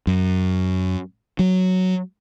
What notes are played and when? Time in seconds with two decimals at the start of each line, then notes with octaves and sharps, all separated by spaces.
0.07 F#2
1.39 F#3